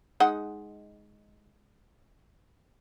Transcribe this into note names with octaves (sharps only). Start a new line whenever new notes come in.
G#3 D#4 F#5